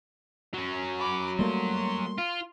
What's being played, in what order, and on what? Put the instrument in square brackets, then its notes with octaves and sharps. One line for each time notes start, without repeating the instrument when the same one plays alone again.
[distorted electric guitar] F#3 C#4
[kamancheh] B5 D6
[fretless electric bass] G3 A3 A#3 [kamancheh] C6
[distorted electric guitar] F4